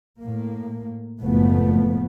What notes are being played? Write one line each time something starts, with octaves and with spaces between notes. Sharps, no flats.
A2 A#3
F#1 A2 F3 A3 B3